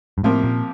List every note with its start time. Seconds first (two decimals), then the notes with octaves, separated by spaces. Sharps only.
0.18 G2
0.23 A2 C3 F3 A#3
0.44 A#2